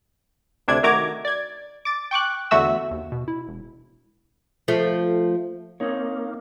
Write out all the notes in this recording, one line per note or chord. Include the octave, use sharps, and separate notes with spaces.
D2 C3 D4 G#6
D#3 A3 F#4 A#5 D6 G#6
D5 G#6
D6 A6
G5 C#6 D6 F#6
E2 D3 A3 F#4 E5 E6
D#2
B2
E4
E1
F3 A3
A#3 C4 D#4 C#5